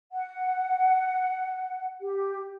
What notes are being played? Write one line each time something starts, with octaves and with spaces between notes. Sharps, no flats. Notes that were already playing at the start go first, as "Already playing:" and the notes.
F#5
G4